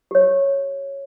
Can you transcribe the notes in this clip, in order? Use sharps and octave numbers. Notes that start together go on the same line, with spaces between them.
G4 C#5